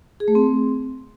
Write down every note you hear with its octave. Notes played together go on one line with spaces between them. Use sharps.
G#4
A3
C4